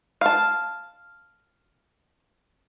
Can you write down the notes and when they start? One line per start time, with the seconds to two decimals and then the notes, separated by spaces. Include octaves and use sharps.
0.21 F5 A5